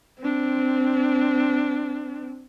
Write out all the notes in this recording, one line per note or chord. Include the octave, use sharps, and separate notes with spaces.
C4 D4